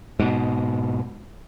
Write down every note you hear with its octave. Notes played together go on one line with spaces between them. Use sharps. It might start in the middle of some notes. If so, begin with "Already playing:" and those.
G#2 B2